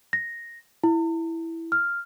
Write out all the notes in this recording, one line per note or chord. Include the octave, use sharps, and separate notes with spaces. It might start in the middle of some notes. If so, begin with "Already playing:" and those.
A#6
E4
F6